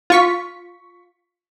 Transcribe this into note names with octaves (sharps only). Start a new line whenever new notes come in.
F4 C#6 B6